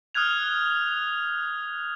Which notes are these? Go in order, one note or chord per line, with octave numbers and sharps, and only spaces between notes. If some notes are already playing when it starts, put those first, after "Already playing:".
D#6 F6 F#6 G#6 F7